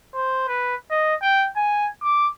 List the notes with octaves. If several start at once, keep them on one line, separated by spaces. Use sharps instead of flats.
C5
B4
D#5
G5
G#5
D6